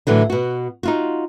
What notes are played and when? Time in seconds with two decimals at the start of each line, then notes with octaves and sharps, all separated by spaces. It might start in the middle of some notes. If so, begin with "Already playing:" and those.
0.07 A2 D3 E3 F#3
0.30 B2 F#4
0.83 D#4 F4 F#4